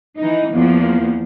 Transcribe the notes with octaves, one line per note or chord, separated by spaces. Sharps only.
E3 D#4
E2 F3 A#3